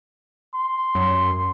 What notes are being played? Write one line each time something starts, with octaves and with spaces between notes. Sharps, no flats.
C6
F#2